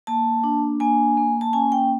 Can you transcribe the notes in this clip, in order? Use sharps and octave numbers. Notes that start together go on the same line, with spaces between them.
A#3 A5
D4
A#3 G#5
A#3
A5
C#4 G#5
G5